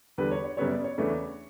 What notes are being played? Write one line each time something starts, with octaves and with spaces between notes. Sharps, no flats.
E2 D3 G3 B4
C#5
C#5
F#2 C#3 G3 B3 C#5
D5
C#5
E2 C#3 E3 A3 D4